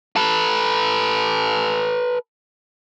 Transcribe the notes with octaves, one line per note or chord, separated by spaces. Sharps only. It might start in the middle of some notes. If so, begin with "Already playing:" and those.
A4 B4